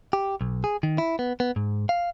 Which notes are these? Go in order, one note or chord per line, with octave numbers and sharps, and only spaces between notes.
G4
B1
G#4
D#3
E4
B3
B3
G#2
F5